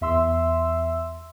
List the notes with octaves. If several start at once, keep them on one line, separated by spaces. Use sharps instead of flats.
E2 E5 C6 E6